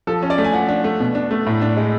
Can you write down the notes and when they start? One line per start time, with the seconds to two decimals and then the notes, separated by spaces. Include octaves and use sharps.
0.07 F3 A4
0.23 C#4
0.30 D5
0.38 A3
0.44 G#5
0.53 F3 F#5
0.69 D4
0.84 A3
1.00 B2
1.15 D4
1.31 A3
1.47 A2
1.62 D4
1.77 G#3